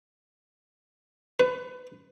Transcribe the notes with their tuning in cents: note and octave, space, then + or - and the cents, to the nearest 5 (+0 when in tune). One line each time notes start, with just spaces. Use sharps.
B4 +25